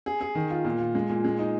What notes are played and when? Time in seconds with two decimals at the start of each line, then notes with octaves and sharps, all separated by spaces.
0.06 G#4
0.21 G#4
0.35 D#3
0.50 F4
0.65 A#2
0.80 F4
0.95 G#3
1.10 A#2
1.24 G#3
1.39 D#4